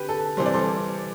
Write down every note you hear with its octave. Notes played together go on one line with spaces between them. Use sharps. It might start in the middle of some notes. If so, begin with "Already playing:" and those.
Already playing: D3 G4 B4
A4
C3 E3 G3 C5
D5
A4 C5